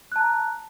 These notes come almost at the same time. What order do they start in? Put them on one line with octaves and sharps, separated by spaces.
F#6 A5 A#5